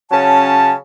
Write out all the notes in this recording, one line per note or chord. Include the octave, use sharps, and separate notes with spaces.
C#3 F#3 C#4 A5